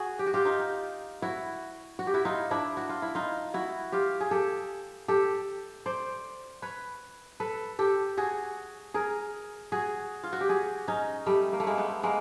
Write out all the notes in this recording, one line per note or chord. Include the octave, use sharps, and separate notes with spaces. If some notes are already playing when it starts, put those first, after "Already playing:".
Already playing: F#4 G#4
G4
F#4
F4 G4
D#4 F4
E4 F#4
F#4
G4
E4 F#4
D#4 F4
D4 E4
F#4
F4
E4
D#4 F4
E4 F#4
F4 G4
G#4
G4 A4
G4 A4
C5 D5
B4 C#5
A4 B4
G4 A4
F#4 G#4
G#4 A#4
F#4 G#4
F4
F#4
G4
F#4 G#4
C#4 D#4
G3 A3
A#3
A3
G#3 A#3
A3 B3
G#3 A#3